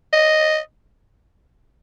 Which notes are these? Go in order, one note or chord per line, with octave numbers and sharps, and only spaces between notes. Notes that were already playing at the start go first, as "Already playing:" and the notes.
D#5